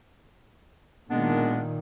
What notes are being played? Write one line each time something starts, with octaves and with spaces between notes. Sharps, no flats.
A#2 D#3 G#3 B3 D4